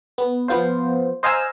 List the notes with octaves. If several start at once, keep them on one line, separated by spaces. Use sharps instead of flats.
B3
F3 B3 F4 C5
C5 D#5 F5 G#5 A#5 E6